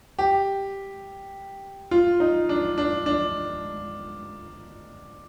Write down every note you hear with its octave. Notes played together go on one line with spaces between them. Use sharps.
G4
F4
D#4
D4
D4
D4